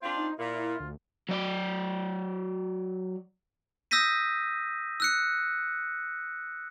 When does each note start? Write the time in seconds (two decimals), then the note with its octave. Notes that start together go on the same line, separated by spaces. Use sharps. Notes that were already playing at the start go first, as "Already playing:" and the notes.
0.02 C4 D4 F4 C5
0.17 D#4
0.39 A#2 E4 F4
0.80 D2
1.29 F#3 D5
3.91 D#6 E6 G6 A#6 B6 D#7
5.00 E6 F#6 C#7